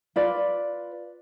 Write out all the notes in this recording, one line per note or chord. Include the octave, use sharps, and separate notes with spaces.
F4 B4 D5